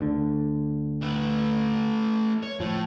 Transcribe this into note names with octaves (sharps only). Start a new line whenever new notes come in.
D2 D3
A3 B4
C#5
A2 F3